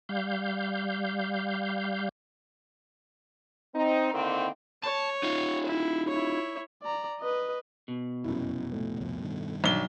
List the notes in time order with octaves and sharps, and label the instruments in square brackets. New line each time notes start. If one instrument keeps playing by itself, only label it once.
[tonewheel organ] G3 F5 G6
[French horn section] C4 D#4
D3 D#3 A#3 C4 D#4 E4
[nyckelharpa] C#5 [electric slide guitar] A5
[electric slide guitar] D#4 F4
[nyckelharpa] E4
E4 C#5
[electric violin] D5 A#5
B4 D#5
[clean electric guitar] B2
[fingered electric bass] F1 [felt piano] F#2 E4
[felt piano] A2
[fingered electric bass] C2 F2
G2 D#3
[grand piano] B1 G7 [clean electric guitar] D4